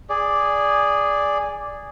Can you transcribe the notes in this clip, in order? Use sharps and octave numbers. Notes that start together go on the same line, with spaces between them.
G#4 D5